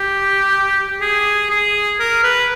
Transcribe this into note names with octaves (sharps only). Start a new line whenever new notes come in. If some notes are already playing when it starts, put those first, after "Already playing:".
Already playing: G4
G#4
G#4
A#4
B4